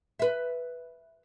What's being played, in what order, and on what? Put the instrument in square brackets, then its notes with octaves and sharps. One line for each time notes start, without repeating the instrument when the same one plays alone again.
[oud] B4 E5